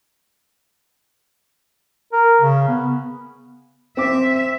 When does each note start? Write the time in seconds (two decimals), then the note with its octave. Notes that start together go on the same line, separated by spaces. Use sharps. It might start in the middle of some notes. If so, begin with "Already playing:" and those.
2.12 A#4
2.42 C#3
2.68 B3
3.97 C4 E5 D6